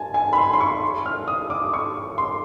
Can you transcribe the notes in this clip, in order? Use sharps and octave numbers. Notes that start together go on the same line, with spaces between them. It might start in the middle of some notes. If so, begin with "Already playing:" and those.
Already playing: G#5 A5
G#5
B5
C6
C6
C#6
F6
D#6
D6
C#6
C6